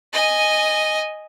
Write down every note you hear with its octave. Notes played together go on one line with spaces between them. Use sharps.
D#5 G#5